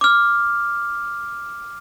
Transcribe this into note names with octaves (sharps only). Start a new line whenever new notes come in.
D6 F6